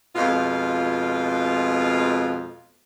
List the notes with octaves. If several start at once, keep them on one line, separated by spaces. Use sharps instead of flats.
F2 B2 G#3 F4 F5